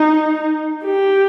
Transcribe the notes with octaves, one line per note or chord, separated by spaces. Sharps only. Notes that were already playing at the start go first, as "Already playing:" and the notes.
Already playing: D#4
G4